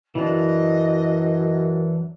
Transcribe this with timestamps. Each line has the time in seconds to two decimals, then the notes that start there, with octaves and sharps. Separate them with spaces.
0.15 F#2 E3 F#3 D4 D#5